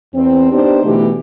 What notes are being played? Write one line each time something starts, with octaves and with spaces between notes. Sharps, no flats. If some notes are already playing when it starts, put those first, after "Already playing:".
E2 C4
B3 D4 D#4 G4 C5
B2 D3 E3 A3 G4